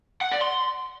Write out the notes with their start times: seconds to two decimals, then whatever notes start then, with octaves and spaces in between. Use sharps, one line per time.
0.21 F#5
0.31 D5
0.41 C6